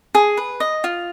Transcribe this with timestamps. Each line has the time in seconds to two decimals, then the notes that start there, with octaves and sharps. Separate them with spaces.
0.15 G#4
0.37 B4
0.60 D#5
0.84 F4